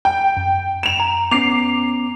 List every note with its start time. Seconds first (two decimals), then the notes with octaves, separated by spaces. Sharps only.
0.05 G5
0.37 F#2
0.83 E7 F7
1.00 A#5
1.31 B3 C#4 D6 C7 F7